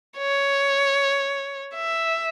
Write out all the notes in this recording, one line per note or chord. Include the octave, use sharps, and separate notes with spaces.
C#5
E5